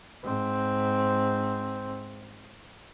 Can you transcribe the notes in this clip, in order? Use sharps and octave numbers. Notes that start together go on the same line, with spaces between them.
G#2 C4